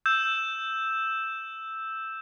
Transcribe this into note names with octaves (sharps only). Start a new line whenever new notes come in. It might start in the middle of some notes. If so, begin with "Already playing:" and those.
E6 G6 E7